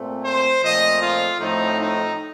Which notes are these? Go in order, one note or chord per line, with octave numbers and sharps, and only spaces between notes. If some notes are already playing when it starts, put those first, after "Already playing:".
Already playing: A#2 A3 C4
C5
A#2 F3 A3 C4 D#5
F4
A2 F3 A3 C4 D#4
D#4